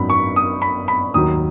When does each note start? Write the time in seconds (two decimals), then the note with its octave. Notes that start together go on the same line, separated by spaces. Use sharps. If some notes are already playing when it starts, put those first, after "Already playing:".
Already playing: G#1 F#2 F#3 B3 D#4 B5
0.10 C#6
0.36 D#6
0.62 B5
0.88 B5
1.14 D#2 D#3 F#3 D#4 D#6